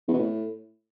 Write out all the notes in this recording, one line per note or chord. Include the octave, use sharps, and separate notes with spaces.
E2
B2
A2